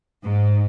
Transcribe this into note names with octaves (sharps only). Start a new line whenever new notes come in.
G#2